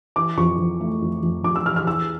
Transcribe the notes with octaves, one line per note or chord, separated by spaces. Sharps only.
E3 D6
F2 C#6
F2
A3
F2
F2
F2 D6
E6
E3 F6
F6
E2 E6